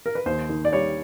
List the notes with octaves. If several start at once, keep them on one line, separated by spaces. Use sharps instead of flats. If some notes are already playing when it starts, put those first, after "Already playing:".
A#4
B4
D#2 C5
D#3
D5
G3 C#5